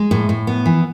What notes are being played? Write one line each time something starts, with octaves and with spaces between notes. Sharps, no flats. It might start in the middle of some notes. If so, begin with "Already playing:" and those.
Already playing: G#3
A2
A2
B3
E3